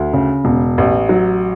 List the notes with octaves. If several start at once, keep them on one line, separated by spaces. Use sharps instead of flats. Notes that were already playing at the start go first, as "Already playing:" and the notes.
Already playing: D2
C#3
E1
A1
F#3